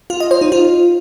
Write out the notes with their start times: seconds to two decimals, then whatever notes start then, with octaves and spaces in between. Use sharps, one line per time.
0.10 F4
0.20 D#5
0.31 C5
0.41 D#4
0.52 F4